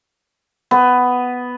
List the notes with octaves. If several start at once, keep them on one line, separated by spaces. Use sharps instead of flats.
B3